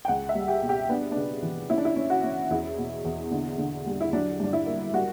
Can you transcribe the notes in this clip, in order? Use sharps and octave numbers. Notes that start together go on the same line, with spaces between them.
G5
C#2 F#5
E5
G3
G4
B2
G4
B3 D4
C#3 D4
E3
C#4 E4
D4
E4
C#4
F#4
C#4
E2 E4
B2
E2
D3
D3
G3
E4
F#3 D4
G2 D4
E4
A#3
G3 F#4